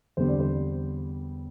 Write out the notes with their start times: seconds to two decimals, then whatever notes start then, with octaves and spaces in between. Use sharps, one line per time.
0.17 E2 D3 G3 C4 C5
0.28 D5
0.40 C5